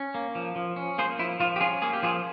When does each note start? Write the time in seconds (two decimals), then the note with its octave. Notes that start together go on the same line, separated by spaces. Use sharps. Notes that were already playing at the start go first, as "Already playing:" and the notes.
Already playing: C#4
0.14 A#3
0.35 F3
0.56 F3
0.76 C#4
0.98 A#3 G#4 C5
1.19 F3 E4
1.40 F3 F4
1.56 G4
1.60 C#4 F4 G#4
1.82 A#3 G#4
1.93 G4
2.03 F3 F4 G#4